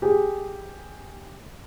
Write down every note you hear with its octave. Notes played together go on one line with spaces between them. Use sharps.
G4 G#4